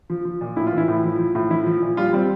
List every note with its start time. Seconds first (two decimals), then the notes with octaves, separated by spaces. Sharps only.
0.10 F3
0.25 F3
0.41 A#2
0.56 A2 E4
0.67 F4
0.72 E3
0.77 E4
0.88 A2
1.03 F3
1.19 F3
1.35 A2
1.50 F3 E4
1.66 F3
1.82 A#2
1.97 G3 F4
2.13 G3 C4